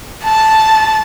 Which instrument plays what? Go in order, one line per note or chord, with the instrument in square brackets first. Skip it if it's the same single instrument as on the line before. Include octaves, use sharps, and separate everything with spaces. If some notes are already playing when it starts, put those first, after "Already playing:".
[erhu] A5